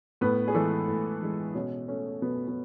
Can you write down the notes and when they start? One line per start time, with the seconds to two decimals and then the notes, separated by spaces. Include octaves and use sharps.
0.21 A2 B3 B4
0.48 G#4
0.55 E3 G#3 A3 A4
0.88 A2
1.22 E3 G#3
1.55 B2 C#4
1.88 A3 C#4
2.22 B2 B3
2.48 B3